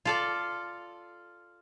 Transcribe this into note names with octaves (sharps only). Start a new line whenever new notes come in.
F4 A4 D5